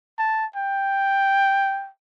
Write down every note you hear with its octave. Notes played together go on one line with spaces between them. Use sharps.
A5
G5